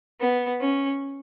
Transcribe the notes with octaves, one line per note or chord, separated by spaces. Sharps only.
B3
C#4